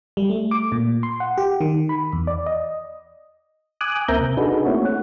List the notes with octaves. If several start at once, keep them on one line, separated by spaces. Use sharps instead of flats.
G3
A3
D6
A#2
C6
F#5
G4
D#3
B5
E2
D5
D#5
G#5 D6 D#6 F#6
D2 A#3 C4 E5 A#5 G6
C3
D4 D#4 F#4 G#4 A4 B4
A3 A#3 C4 E4 F#4 C#5
F#5